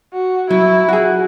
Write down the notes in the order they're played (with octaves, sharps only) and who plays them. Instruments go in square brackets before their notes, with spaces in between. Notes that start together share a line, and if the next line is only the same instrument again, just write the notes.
[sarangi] F#4
[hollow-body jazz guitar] F#3 [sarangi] E4
[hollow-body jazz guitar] F#4 G#4